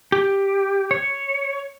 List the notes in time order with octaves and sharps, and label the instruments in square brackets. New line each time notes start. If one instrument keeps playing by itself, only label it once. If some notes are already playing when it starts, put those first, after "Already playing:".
[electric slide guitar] G4
C#5